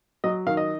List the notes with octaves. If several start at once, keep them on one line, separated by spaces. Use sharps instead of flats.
F#3 D#5
D#3 F5
D#5